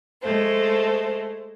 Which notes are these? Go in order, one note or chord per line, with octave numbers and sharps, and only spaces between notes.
G#3 A3 C5